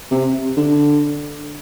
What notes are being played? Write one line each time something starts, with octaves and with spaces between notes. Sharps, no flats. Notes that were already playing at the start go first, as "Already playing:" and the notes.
C3
D3